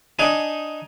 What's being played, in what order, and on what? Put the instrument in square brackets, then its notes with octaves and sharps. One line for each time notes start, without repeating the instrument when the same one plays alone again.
[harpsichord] D4 D#4 G#5